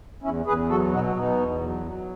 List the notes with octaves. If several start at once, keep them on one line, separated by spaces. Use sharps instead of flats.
E2 C#4 E4
E2 G#4 B4
F#3 F#4 A4
B2 D#4 F#4
B2 B3 D#4
E2
F#3
F#3